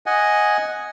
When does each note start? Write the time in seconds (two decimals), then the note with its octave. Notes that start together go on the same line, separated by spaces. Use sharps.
0.06 D#5 F#5 G#5